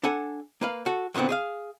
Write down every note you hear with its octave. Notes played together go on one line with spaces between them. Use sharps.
D4 A4 F#5 G#5
A#3 B4 F5
F#4 A4
E2 A#2 D3 B3 C4
G#4 D5 F5